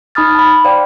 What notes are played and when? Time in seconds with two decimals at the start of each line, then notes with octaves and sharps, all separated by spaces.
0.15 D#4 B5 D#6 F6 A6
0.35 A5 B5
0.65 C5 D5 F5 G5